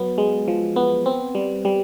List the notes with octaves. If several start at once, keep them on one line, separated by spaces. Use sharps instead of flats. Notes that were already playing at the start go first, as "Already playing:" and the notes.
Already playing: F#3 B3
G#3
F3
B3
C4
G3
G3